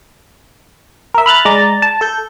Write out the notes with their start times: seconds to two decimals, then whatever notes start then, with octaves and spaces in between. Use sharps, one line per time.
1.15 A#4 E5
1.26 B5 F6 F#6 A6
1.45 G#3 D5 A#5 A6
1.82 A5
2.01 A4 G6